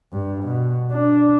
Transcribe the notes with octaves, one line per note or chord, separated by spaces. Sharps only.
G2
B2
D4